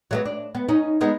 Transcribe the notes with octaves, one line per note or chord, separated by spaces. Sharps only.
F#3 A3 B3
D4
B3
C#4 D#4
G#3 B3 D#4